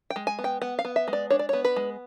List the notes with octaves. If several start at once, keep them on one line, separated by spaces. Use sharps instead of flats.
G5
G#3
G#5
B3
G5
B3 F#5
F5
B3
E5
G#3
D5
D4 C#5
D5
B3 C#5
B4
G#3